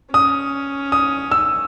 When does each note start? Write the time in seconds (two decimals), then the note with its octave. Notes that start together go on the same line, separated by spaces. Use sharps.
0.13 C#4 D#6
0.92 D#6
1.31 E6